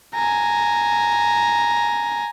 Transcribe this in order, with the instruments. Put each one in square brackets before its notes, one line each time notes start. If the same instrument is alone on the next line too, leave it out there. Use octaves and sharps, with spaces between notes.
[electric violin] G#5 A#5